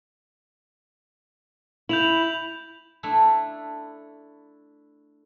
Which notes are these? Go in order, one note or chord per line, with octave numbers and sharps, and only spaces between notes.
E4 G6 F7 F#7
A3 D4 E4